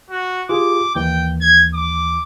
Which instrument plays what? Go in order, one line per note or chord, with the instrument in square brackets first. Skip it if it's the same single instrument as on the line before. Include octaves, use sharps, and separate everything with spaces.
[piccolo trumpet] F#4
[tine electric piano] F4 G4 G#4 [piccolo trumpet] D6
[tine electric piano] D#2 E3 [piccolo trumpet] G5
[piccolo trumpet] G#6
D6